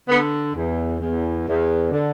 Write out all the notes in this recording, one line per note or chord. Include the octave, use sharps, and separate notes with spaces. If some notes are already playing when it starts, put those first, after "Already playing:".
D3 B3
E2
E2
E2
D3